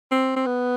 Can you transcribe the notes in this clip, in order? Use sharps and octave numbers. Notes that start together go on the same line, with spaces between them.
C4
C4
B3